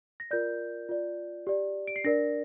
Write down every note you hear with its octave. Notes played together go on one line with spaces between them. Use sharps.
A#6
F4 A#4 D5 G6
F4 D5
G4 D5
D7
C7
D4 A#4 D5 A#6